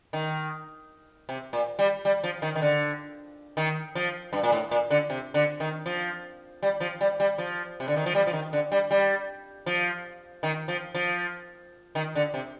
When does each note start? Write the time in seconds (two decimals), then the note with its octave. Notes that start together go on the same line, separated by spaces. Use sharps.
0.13 D#3
1.29 C3
1.53 A#2
1.79 G3
2.05 G3
2.23 F3
2.42 D#3
2.56 D#3
2.62 D3
3.57 D#3
3.95 F3
4.33 G2
4.43 A#2
4.52 A2
4.71 A#2
4.90 D3
5.10 C3
5.34 D3
5.60 D#3
5.86 F3
6.63 G3
6.80 F3
7.01 G3
7.20 G3
7.38 F3
7.80 C3
7.88 D3
7.96 D#3
8.06 F3
8.15 G3
8.27 F3
8.33 D#3
8.53 D3
8.72 G3
8.91 G3
9.66 F3
10.43 D#3
10.68 F3
10.94 F3
11.95 D#3
12.15 D3
12.34 C3